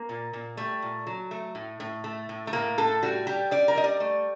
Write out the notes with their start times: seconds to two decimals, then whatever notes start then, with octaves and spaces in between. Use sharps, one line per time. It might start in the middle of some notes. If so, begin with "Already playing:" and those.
Already playing: A#3
0.09 A#2
0.33 A#2
0.57 G3 A3
0.82 A#2
1.07 F#3
1.31 A3
1.55 A2
1.80 A2
2.04 A3
2.29 A2
2.47 A3
2.53 A2 A#3
2.78 A2 A4
3.03 G3 F#4
3.27 G3 G4
3.51 G3 D5
3.68 A#4
3.75 G3 D#5
3.84 D5
4.00 A3